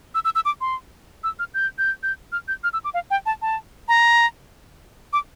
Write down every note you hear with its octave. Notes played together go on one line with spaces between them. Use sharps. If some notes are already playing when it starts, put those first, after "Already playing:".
E6
E6
E6
D6
C6
E6
F6
G6
G6
G6
F6
G6
F6
E6
D6
F5
G5
A5
A5
A#5
D6